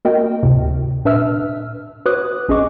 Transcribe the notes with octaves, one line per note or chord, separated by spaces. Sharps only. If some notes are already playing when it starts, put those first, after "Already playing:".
A#3 F#4 A#4 D#5 G5
D2 A2 C3
A#2 D4 B4 E5 E6 F6
F#4 B4 C#5 D6 D#6 F#6
A#1 C#4 G#4 D#5 C#6 D6